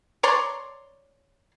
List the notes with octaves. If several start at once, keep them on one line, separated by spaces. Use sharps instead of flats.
C#5 D5 A#5 C6